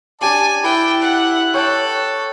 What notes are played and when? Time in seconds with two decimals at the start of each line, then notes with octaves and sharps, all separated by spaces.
0.21 D4 G4 D5 G#5 A5 D6
0.64 E4 B4 G5 A5
1.02 F#5 F#6
1.54 A4 C#5 G5